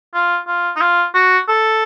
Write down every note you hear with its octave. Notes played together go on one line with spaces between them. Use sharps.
F4
F4
D#4
F4
F#4
A4